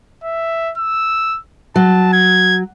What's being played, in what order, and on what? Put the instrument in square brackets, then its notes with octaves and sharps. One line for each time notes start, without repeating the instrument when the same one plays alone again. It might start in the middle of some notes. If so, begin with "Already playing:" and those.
[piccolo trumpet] E5
E6
[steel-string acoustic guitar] F#3 [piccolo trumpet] A5
[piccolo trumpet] G#6